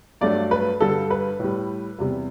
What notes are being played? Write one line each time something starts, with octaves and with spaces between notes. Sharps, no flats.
G2 F#3 A3 D5
B4
G2 D3 G3 A4
B4
A2 G3
E2 C3 G3